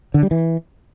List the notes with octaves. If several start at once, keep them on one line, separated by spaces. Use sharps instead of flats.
D3
G3
E3